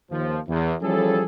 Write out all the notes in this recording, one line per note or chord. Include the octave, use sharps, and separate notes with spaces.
D#2 F3
E2
E3 F3 G3 C#4 G#4 A4